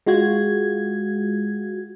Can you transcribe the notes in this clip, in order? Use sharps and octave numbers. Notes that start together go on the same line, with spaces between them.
G#3 F4 F#4 G#6